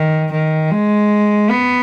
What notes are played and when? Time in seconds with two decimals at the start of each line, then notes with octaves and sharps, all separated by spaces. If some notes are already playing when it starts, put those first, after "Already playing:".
Already playing: D#3
0.31 D#3
0.71 G#3
1.50 B3